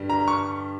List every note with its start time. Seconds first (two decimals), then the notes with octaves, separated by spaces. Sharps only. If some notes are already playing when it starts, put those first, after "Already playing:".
Already playing: G2 D3 G3
0.10 A#5
0.28 C#6